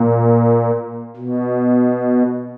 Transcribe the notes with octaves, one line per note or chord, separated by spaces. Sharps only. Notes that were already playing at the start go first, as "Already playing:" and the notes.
Already playing: A#2
B2